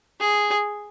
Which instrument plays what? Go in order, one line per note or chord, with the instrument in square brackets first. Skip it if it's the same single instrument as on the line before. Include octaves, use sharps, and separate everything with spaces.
[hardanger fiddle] G#4